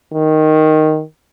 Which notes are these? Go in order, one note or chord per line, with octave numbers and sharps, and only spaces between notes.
D#3